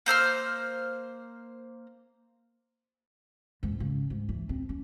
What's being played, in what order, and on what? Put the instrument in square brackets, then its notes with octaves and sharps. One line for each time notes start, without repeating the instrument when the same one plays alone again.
[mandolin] A#3 C5 E6 F6
[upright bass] F2 G#2
G#2 C#3
G#2
E3
C4
C#4